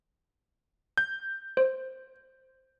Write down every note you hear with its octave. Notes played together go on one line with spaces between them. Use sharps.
G6
C5